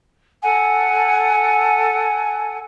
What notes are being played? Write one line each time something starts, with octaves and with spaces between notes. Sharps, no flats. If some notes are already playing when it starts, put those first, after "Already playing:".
A4 F#5 G#5